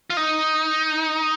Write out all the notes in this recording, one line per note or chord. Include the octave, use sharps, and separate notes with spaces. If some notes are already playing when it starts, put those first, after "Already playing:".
F4
D#4